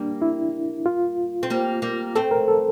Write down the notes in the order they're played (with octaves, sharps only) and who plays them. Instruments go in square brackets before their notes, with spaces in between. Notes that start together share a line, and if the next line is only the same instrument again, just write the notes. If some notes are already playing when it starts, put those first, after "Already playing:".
Already playing: [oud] G3 A#3 [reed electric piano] D4
[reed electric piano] E4
F4
[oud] C4
G3 A#3
G3 A#3
[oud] A3 C4 [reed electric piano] A4
[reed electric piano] A#4
A4